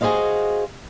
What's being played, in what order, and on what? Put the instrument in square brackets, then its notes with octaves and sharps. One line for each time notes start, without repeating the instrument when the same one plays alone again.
[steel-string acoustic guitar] F#4 G#4 B4 C5 D#5 F5